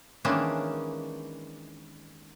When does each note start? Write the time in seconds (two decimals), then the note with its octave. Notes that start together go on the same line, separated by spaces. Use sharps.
0.25 D#3 E3 G#3 A#3 C#4 D4